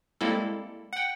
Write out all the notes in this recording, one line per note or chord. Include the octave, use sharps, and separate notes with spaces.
G3 G#3 A#3 C4 E4 A4
F#5 G5